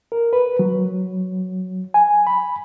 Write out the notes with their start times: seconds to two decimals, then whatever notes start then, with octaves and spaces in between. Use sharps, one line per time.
0.12 A#4
0.33 B4
0.59 F#3
1.94 G#5
2.27 B5